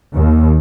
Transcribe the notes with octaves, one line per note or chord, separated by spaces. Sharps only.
D#2